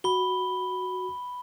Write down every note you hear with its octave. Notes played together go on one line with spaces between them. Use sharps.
F#4 B5 G7